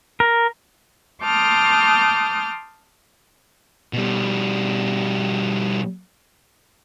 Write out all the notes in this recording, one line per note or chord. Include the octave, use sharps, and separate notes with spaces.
A#4
A5 C6 D6 D#6 F6 G6
B2 G3